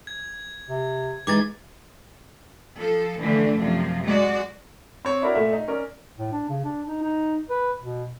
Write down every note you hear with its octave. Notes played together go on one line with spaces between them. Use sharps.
G#6
C3
E3 G#3 D#4 D6 G#6 A6
F3 A4
D3 E3 F3 A3 D4
F#2 C3 F3
G#3 F#4 D5
C4 C#5
D4 E4 F#4 A#4 D5
A#2 A3 E5
D#4
C#4 A#4 D5
A2
D4
C#3
D4
D#4
D#4
B4
B2